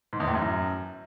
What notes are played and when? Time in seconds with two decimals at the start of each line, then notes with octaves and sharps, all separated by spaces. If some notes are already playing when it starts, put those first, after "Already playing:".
0.13 G#2
0.20 E2
0.27 A2
0.35 F#2